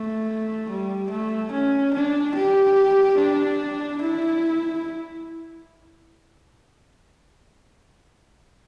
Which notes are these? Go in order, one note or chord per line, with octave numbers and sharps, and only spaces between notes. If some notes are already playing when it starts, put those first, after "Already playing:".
Already playing: A3
G3
A3
C#4
D4
G4
D4
E4